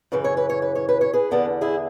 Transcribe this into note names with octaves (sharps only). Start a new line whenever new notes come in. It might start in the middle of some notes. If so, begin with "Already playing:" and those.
F#2 C#3 E3 B4
C#5
B4
C#5
B4
C#5
B4
C#5
G#4 B4
E2 D3 B3 D4
E4 G#4